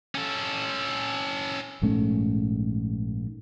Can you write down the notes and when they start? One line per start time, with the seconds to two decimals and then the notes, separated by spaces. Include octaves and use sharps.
0.15 C#4 A4
1.82 A#1 G#2 A3 C#4